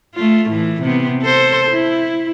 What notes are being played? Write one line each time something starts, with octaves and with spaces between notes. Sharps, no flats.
A3 F4
A2 E3
C3 B3
A4 C5
E4